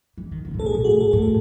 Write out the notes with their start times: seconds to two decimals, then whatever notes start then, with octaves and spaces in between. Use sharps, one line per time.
0.18 E3
0.31 D#3
0.45 C#3
0.54 A2
0.59 B2 A4
0.66 G#4
0.74 B2
0.84 A2 F#4 G#4
0.99 G#2 A4
1.11 A2 A4
1.22 A4